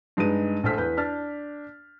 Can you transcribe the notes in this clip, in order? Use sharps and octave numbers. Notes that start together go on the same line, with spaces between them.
G2 G#3 D#4 B4 D#7
A#1 A3 A4 C5 F6 B6
E2 B4 G6
D4 F6 A6